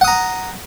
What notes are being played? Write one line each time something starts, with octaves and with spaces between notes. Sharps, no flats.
F#5 A#5 D#6